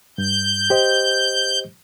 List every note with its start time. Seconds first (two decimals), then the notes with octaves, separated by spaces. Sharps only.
0.18 G2 G6
0.70 G4 C5 D#5